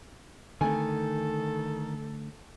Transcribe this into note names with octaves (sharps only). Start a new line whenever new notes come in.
D3 D#3 A3 A4 G#5